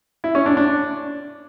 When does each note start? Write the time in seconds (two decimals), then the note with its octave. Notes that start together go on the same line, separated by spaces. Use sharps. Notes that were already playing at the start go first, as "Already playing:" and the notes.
0.24 E4
0.35 C#4
0.46 D4
0.57 D4